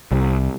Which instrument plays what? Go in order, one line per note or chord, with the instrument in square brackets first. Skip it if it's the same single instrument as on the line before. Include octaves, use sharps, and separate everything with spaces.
[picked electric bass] C2